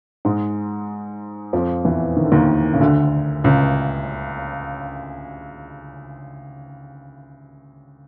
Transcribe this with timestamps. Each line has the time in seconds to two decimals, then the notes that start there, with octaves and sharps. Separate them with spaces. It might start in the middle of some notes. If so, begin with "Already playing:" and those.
0.25 G#2 G#3
1.53 F2 F3
1.85 E2 E3
2.17 D#3
2.25 D3
2.32 D#2 D#3
2.74 C#3
2.80 D2 D3
3.44 C#2 C#3